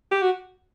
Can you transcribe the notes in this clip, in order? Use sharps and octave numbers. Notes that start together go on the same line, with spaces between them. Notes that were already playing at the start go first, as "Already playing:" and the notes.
G4
F#4